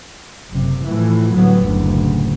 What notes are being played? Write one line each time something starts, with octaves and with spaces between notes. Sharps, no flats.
F#1 C3
A2 E3 F3
D2 A2 F#3 G3 B3
F#1 D2 A2